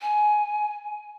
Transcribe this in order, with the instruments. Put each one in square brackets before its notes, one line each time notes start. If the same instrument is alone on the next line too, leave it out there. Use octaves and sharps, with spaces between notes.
[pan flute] G#5